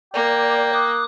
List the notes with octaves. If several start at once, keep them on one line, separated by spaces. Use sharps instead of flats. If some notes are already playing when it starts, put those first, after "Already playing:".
A#3 D5 G5
D6 D#6 F#6